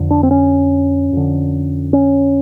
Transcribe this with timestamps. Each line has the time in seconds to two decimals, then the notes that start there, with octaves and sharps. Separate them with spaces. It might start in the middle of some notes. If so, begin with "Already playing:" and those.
Already playing: F2 D3
0.11 D4
0.23 C4
0.31 C#4
1.13 F2 D3
1.93 C#4